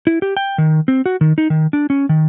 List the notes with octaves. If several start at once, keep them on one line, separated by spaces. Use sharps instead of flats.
E4
G4
G5
D#3
C4
F#4
D#3
D#4
D#3
D4
C#4
D#3